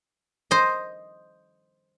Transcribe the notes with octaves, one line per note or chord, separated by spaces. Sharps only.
C5 D#5